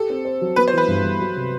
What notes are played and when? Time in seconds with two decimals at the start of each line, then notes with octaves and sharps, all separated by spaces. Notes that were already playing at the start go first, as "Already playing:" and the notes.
Already playing: G4 A4
0.10 C4
0.25 C5
0.41 F#3
0.56 B3 B4
0.68 C5
0.73 E3 B4
0.88 G2
1.04 G2
1.20 F#3
1.36 C3